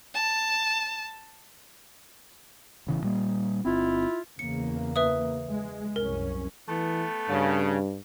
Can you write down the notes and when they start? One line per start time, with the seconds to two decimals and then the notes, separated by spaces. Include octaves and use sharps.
0.15 A5
2.87 A1 C#3 E3
3.02 A#2 G3 A#3
3.65 G1 C4 E4 F4
4.39 E2 C#3 A#3 C#7
4.96 B4 E5 D#6
5.48 G#3
5.96 C2 F#2 C#4 A#4
6.69 E3 A3 B3
7.30 G2 C#3